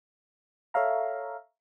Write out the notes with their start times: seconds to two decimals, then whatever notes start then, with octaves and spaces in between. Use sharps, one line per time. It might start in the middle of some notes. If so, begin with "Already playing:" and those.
0.74 A4 C#5 E5 F5 A#5